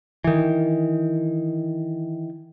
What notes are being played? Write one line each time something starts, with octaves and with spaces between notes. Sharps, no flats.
D#3 E3